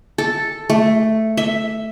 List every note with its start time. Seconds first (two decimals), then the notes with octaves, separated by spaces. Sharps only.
0.18 A4
0.70 A3
1.37 E5